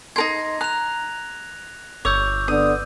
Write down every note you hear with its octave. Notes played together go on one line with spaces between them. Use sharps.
D#4 A#4 C6 G#6 A#6
A#5 F#6 F7
G1 C#5 D6 E6 G6
D3 B3 D4 D#6